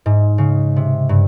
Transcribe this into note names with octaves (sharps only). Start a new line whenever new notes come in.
G#2
C#3
C3
G2